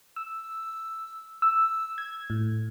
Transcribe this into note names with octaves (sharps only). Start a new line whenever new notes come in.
E6
E6
G#6
A2